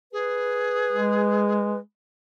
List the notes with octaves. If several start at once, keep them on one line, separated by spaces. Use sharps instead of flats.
G#4 B4
G#3